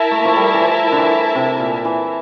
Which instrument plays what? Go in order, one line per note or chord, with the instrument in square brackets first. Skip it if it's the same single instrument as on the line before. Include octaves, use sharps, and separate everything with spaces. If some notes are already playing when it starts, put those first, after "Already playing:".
Already playing: [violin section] E4 A#4 E5 A5
[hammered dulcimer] A3
A#3
F3 A3
G3
E3
F3
D3
E3
C3
A#2
E3